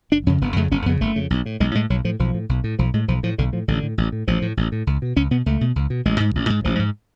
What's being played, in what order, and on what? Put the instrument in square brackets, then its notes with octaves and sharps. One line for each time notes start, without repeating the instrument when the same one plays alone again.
[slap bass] F#1 D4
F2 C#3 C#4
F#1 B3
F2 C#3 A3
F#1 C#4
F2 B3
C#3
F#1 A3
F2 C#3
B1
A2
B1 G#3
A2 G#3
B1 F#3
A2 F3
B1 F3
A2
B1
A2
B1 F3
A2 G#3
B1 F3
A2 F3
B1 D3
A2 F3
A1 D3
A2
A1
A2
A1 F3
A2
A1
A2
C#2
B2
C#2 C#4
B2 B3
C#2 A3
B2
C#2
B2
A1 G#3
G#2
A1
G#2
A1 F3
G#2